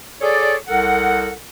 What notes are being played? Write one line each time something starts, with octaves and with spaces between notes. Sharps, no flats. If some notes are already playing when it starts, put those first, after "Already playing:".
G#4 A4 C#5 D5
C2 A4 A#4 F#5